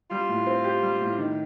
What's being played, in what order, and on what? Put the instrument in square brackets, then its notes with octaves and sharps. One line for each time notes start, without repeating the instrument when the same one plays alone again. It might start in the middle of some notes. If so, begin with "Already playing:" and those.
[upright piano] G3 [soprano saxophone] F4
[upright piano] A2
C4
G4
G3
A2
D#3